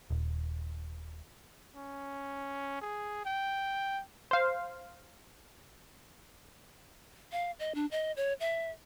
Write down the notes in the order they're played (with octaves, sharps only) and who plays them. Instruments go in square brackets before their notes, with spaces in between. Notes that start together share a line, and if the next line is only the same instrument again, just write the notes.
[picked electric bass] D#1
[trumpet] C#4
G#4
G5
[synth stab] C5 F5
[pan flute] F5
D#5
D4
D#5
C#5
E5